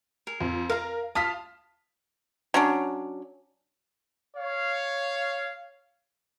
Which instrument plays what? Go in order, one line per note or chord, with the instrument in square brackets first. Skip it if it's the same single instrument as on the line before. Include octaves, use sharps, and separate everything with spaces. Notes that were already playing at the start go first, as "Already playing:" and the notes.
[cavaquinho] G#4 A#4
[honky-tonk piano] F2
[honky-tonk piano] A#4 [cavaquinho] F5 A#5
[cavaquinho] F4 D#6 [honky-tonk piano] A5 F6 B6
[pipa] F#3 C#4 D4
[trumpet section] C#5 F5